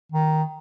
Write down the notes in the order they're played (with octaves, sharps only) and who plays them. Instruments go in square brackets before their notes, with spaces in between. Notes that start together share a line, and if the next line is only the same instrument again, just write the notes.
[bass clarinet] D#3